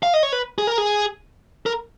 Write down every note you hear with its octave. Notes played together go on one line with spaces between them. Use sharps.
F5
D#5
C#5
B4
G#4
A#4
G#4
A#4